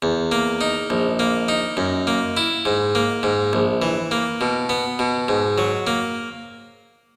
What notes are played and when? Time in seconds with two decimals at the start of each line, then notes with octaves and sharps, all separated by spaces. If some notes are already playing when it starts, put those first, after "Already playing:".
0.02 E2
0.32 A#3
0.61 D#4
0.90 A#1
1.19 A#3
1.49 D#4
1.77 F#2
2.07 A#3
2.37 E4
2.65 G#2
2.95 A#3
3.23 G#2
3.53 A#1
3.82 E3
4.11 A#3
4.41 B2
4.69 B3
4.99 B2
5.28 G#2
5.58 F#3
5.87 A#3